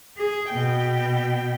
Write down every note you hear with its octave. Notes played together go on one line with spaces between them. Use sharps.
G#4
B2 G5